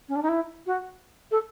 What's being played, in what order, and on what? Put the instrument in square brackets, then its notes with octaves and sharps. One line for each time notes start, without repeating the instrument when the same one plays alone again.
[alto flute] C#4
D4
D#4
E4
F#4
A4